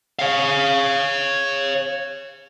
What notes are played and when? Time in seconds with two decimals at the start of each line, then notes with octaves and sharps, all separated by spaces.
0.19 C#5 F5